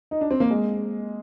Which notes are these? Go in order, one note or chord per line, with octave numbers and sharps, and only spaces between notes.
D#4
D4
C4
A#3
G#3